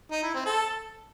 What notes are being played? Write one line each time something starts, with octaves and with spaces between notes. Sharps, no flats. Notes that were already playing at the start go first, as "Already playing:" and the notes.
D#4
E4
C4
A4